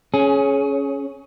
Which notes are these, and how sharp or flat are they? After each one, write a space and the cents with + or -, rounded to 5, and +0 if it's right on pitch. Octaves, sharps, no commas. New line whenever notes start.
C#4 +0 G#4 +25